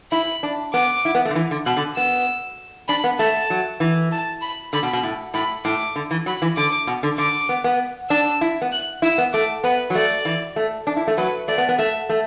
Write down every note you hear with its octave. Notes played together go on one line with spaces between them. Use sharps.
E4 B5
D4
B3 D6
E4
B3
A3
D3
E3
D3
B2 F#6
D3
B3 E6
D4 B5
B3
A3 A5
F#3
E3
A5
B5
D3 B5
B2
B2
A2
A2 B5
A2 D6
D3
E3
F#3 B5
E3
D3 D6
B2
D3
D3 D6
B3
B3
D4 E6
E4
B3
F#6
E4 E6
B3
A3 D6
B3 B4
F#3
A3 D5
E3
A3
D4
E4
A3
F#3 B4
A3 D5
B3
B3
A3 E5
A3